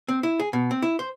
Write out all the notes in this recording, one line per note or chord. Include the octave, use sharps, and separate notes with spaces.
C4
E4
G#4
B2
C4
E4
C5